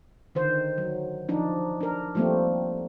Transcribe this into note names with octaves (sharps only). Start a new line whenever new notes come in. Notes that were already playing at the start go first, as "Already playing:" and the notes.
D3 D#3 C5
F#3
F3 D4 D#4
D4 A#4
F3 G3 A3 A#3 C4